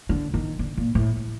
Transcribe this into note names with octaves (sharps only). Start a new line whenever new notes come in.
D3
D#3
D3
A#2
A2